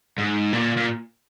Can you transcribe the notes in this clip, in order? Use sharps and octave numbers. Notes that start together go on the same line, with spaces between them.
G#2
A#2
A#2